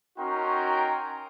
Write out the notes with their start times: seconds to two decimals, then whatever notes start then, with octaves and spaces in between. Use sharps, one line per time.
0.19 C#4 D#4 F#4 A#4 G5 C6